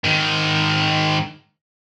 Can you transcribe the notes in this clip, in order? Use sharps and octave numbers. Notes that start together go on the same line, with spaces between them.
G#2 D#3